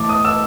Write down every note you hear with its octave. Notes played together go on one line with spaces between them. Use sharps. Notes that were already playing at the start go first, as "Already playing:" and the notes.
Already playing: A2 E3 A5 D6
D#6
E6